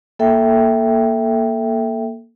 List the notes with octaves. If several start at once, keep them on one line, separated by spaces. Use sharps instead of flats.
A#3 A4 E5 G5